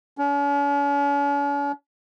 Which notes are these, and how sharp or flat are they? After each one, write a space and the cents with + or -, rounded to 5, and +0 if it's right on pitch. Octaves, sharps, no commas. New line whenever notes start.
C#4 +45